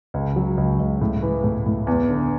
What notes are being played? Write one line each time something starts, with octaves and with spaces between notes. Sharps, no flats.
C#2
F#3
C#2
C#2
A2
E3
A2
A2
E2
D3